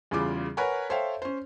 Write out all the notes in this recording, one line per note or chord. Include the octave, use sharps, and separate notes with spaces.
E2 C#3 G3 F4 D6
A#4 B4 C#5 F#5 G#5
A4 C5 C#5 E5 F5 G5
C#4 C5